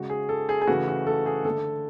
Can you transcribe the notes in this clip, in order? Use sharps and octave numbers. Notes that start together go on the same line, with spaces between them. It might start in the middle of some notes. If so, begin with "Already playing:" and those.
Already playing: C#3 G#3 F#4
G#4
A4
G#4
G#4
C#3 E3 A3 F#4
F#4
A4
G#4
D3 A3 A4